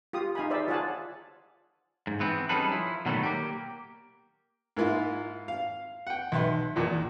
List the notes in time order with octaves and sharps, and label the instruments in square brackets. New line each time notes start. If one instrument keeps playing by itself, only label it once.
[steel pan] F4 G4 D#6
D#4 F5 G#5 B5
G#4 C5 D5 E5
F4 G#4 C#5 D5 F#5 A5
[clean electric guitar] G#2
E3 B3 C4
G3 C#4 D#4 G#4 A4 B4
F3 E4
B2 D#3 F#3 G3 A3 B3
A#3 G4
[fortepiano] G#2 A#3 E4 F4
F5
F#5 G5
B1 B4 E5 C6
A#1 E2 A#2